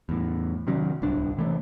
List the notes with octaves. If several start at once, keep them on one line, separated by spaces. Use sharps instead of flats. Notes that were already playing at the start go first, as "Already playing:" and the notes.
E2 A2
C3 D#3 F#3 C#4
D1 C2 D4
C3 E3 A3